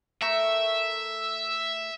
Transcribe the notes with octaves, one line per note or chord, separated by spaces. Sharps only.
A3 A#4 E5 C#6